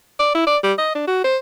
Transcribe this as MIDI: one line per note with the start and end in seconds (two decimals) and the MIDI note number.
0.19 0.34 74
0.35 0.43 64
0.47 0.57 74
0.63 0.73 55
0.78 0.92 75
0.95 1.04 62
1.07 1.21 66
1.24 1.37 72